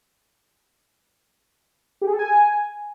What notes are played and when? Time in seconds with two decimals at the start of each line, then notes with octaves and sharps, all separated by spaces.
2.01 G4
2.07 G#4
2.13 A4
2.19 G#5